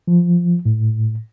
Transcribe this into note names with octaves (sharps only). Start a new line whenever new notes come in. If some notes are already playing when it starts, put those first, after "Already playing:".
F3
A2